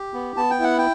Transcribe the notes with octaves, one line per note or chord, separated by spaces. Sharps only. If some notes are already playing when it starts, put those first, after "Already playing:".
Already playing: G4
B3
B3 A5
G5
E4 F#5
G5